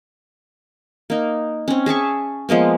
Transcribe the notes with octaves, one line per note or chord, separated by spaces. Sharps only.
A#3 D#4
C4 C#4
G#4 E5 A5 C#6
F3 G#3 A#3 B3